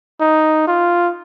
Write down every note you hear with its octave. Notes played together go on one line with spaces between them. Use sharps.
D#4
F4